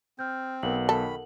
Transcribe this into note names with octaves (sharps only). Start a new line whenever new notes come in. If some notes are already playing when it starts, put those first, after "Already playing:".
C4 F6 G6
B1 B3 A#4 F#5 F#7
D#3 A4 B5